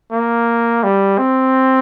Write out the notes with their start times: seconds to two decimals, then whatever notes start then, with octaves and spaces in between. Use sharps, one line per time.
0.12 A#3
0.84 G3
1.18 C4